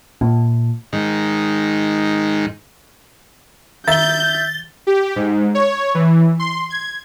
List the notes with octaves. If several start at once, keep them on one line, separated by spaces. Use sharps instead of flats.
A#2
G#2 D#3
D#3 E5 G6 A6 G7
G4
G#2
C#5
E3
C6
G#6